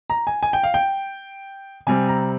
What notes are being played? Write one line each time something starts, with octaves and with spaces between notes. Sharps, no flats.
A#5
G#5
G#5
G5
F5
G5
C3 G3 C4 G#5
A#5